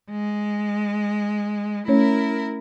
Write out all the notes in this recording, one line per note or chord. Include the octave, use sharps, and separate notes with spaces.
G#3
A3 C#4 E4 A#4 C#5